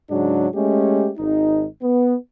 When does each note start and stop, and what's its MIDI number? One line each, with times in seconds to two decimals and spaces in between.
0.10 0.48 44
0.10 0.48 49
0.10 0.48 54
0.10 0.48 62
0.55 1.11 56
0.55 1.11 57
0.55 1.11 61
0.55 1.11 67
1.18 1.67 32
1.18 1.67 63
1.82 2.16 59